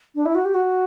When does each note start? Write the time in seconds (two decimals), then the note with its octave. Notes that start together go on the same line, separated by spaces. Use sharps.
0.15 D4
0.25 E4
0.34 F#4
0.45 G4
0.54 F#4